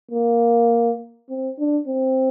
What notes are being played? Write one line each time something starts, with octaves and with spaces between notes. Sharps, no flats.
A#3
C4
D4
C4